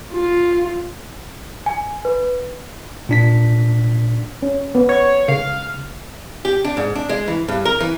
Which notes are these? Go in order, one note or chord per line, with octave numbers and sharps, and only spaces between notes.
F4
G#5
B4
A#2 D4 B6
C#4
B3
C#5
C#3 F5
G4
D4
G#2
D4
G#3
E3
G2
A#4
E3